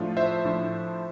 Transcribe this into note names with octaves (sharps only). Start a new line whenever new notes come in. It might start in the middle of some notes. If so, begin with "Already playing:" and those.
Already playing: A2 F3 A3 D4 F4
C5 E5
A2 F3 A3 D4 F4